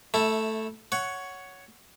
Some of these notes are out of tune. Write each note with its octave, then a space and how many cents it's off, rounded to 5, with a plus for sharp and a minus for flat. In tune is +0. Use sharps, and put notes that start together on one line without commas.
A3 +0 E4 -20 A4 +0
C#5 +5 F#5 +0